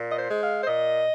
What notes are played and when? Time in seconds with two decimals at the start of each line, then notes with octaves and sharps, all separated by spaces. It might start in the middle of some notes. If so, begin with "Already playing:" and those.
Already playing: A#2
0.08 D#5
0.14 C5
0.28 G#3
0.40 F5
0.60 C5
0.65 A#2 D#5